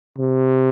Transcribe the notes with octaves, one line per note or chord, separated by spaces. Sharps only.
C3